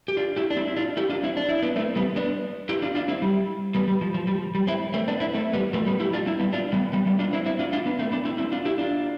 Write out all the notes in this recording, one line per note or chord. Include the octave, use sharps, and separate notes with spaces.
G4
D4 F4
E4 G4
D4
C4 E4
E4
D4 F4
E4 G4
D4 F4
C4 E4
D4
E4
B3 D4
A3 C4
G3 B3
B3 D4
E4 G4
D4 F4
D4 F4
C4 E4
G3
G3 B3
G3
F3
F3
G3
F3
G3
C4 E4
A3 C4
B3 D4
C4 E4
A3 C4
G3 B3
F3 A3
G3 B3
E4 G4
D4 F4
C4 E4
G3 B3
D4 F4
G3 B3
G3 B3
G3 B3
D4 F4
C4 E4
C4 E4
D4 F4
D4 F4
B3 D4
A3 C4
B3 D4
C4 E4
C4 E4
D4 F4
E4 G4
D4 F4